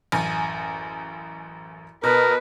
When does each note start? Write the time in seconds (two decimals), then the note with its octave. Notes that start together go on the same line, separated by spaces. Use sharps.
0.12 A1 F#2 G#5
2.04 B2 A#4 B4